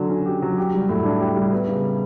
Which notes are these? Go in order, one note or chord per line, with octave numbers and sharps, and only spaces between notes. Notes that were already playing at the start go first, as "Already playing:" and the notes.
Already playing: D3 F#3
C#4
G4
F#3
G4
G3
A2
D4
G4
G3
B3
C#3